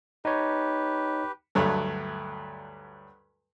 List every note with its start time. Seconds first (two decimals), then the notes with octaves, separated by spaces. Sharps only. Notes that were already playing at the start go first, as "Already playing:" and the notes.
0.25 D#4 G4 B4 C#5
1.55 D2 G2 F#3 A3